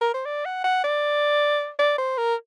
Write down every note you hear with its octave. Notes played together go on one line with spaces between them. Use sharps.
A#4
C5
D5
F#5
F#5
D5
D5
C5
A#4